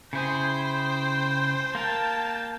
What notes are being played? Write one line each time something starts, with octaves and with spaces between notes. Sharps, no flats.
C#3 E4 G#4 C5 G5
A#3 A#4 G5 A5